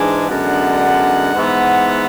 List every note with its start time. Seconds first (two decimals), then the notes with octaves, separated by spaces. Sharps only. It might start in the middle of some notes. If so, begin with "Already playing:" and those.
Already playing: G#2 E3 G#3 D4 G#5
0.29 F#2 D3 G#3 B3 D4 F#5
1.34 G#2 E3 B3